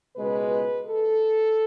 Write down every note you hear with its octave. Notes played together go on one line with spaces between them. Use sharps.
C#2 B2 G#3 B4
A4